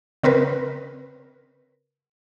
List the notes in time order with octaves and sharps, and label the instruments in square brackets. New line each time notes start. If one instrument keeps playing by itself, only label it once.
[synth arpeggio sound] C#3 C4 A#4 B4